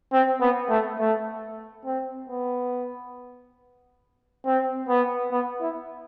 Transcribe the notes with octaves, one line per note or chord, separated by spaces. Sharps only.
C4
B3
A3
A3
C4
B3
C4
B3
B3
E4